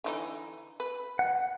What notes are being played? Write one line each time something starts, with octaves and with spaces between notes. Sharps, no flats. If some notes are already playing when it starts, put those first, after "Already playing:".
D3 E3 D#4
B4
F#5